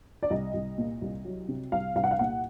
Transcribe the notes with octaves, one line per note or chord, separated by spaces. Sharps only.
D5
C2 D#5
C2
A#2
C2
F#3
C3
C2 F5
C2 F5
F#5
F5
A#2 F#5